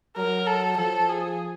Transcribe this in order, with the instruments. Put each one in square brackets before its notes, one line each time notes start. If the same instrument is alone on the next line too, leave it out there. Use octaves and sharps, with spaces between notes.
[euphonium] F#3 [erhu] A#4
[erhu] A4
[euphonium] F3 [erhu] A4
[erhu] G#4